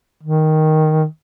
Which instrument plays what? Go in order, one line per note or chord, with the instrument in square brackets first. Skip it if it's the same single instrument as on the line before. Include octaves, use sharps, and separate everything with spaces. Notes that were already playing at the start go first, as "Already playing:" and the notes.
[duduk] D#3